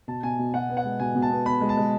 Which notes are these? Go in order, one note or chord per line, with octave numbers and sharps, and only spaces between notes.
B2 A5
B2 G#5
B2
B2 F#5
B3
F#5
G#3
B2 G#5
B2
A5
B3
B3 B5
G#3
A5
G#3